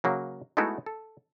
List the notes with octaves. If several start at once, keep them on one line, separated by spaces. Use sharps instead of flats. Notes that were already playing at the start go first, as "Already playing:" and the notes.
C#3 F#3 A#3
G#3 A3 B3 D#4 E4 F#4
A4